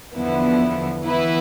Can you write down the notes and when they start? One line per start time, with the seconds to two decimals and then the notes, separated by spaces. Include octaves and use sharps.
0.15 E2 D3 F3 B3 E4
1.03 E3 B3 E4 B4